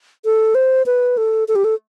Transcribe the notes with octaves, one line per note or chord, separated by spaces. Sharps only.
A4
C5
B4
A4
A4
G4
A4